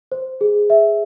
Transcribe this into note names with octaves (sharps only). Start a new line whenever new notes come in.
C5
G#4
E5